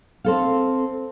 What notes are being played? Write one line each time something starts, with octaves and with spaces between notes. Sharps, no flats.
C4 A4 F5